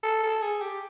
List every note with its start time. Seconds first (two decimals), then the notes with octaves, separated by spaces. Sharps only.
0.03 A4
0.23 A4
0.42 G#4
0.62 G4